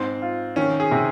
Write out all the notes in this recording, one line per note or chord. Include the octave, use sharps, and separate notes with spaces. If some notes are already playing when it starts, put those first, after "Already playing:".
Already playing: G#2 C4
F4
D#3 C#4
G#4
C3